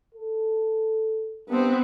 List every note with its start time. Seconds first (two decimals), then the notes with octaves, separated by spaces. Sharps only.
0.14 A4
1.49 G2 B3 C4